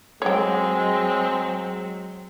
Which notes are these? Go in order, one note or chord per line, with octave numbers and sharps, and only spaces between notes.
F#3 G#3 C4 C#5 G5